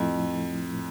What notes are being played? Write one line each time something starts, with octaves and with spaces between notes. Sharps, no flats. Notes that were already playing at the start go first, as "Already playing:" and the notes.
Already playing: F2 A2 F3 A3 E4
A2